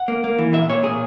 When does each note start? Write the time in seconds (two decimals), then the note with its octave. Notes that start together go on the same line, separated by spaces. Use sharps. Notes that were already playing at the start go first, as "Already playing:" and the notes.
Already playing: F#5
0.08 A#3
0.24 A#3
0.38 E3
0.53 A#2 E5
0.69 A#2 C#5
0.83 A#2 G#4